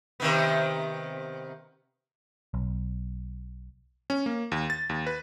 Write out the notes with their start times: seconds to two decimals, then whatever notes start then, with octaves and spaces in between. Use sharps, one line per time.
0.20 C3 D#3 B3
2.54 B1
4.10 C#4
4.26 A#3
4.52 D#2
4.70 A6
4.89 D#2
5.07 B4